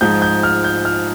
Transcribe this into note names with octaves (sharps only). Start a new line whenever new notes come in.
G#2 F3 G#3 G6
G6
F6
G6
F6